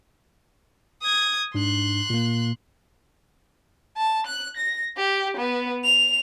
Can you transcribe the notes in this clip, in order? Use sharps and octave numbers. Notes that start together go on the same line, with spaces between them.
D#6 G#6
G#2 D4 C6 F#6
A#2 A#3
A5
F#6
A#6
G4
B3
F7